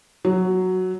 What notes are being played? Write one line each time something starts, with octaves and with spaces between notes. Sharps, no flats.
F#3